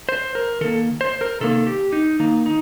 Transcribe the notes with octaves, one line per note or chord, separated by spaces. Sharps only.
C5
A#4
D#3 A#3 A4
C5
A#4
C3 D#3 A#3 A4
G4
D#4
D#3 A#3 D#4
D#4